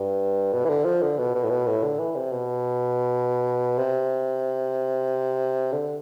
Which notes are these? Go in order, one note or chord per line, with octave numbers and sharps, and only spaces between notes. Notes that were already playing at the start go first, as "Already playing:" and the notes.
Already playing: G2
B2
E3
D3
F3
D3
B2
B2
A2
B2
A2
D3
E3
C3
B2
C3
D3